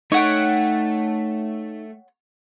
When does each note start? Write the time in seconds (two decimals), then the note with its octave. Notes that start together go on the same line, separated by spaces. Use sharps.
0.12 A3 D#4 C#5 F#5 G5